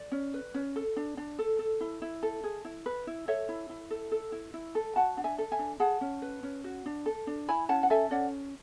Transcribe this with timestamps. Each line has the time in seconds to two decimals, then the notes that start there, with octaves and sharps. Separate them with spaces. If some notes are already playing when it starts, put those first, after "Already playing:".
Already playing: D5
0.12 C#4
0.34 B4
0.54 C#4
0.76 A4
0.96 D4
1.17 D4
1.39 A4
1.59 A4
1.81 E4
2.02 E4
2.23 A4
2.44 G#4
2.65 E4
2.86 B4
3.07 E4
3.28 A4 C#5 E5
3.49 E4
3.69 E4
3.90 A4
4.11 A4
4.32 E4
4.54 E4
4.75 A4
4.96 F#4 F#5 A5
5.17 D4
5.24 E5 G#5
5.38 A4
5.52 E5 G#5
5.59 D4
5.80 G#4 F#5 A5
6.01 C#4
6.22 B4
6.43 C#4
6.64 F#4
6.86 D4
7.06 A4
7.27 D4
7.49 E4 G#5 B5
7.69 C#4 F#5 A5
7.83 F#5
7.90 A4 E5 G#5
8.11 C#4 D5 F#5